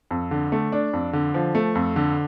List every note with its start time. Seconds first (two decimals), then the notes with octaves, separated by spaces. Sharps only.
0.11 F2
0.31 D3
0.52 A3
0.72 D4
0.93 F2
1.13 D3
1.34 F3
1.55 A3
1.75 F2
1.96 D3